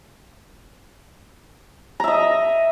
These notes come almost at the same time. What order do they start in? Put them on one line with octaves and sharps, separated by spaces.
A#5 E5 D#5